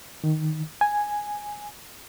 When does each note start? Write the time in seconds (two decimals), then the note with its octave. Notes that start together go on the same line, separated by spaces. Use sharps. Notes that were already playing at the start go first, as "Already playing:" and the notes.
0.24 D#3
0.81 G#5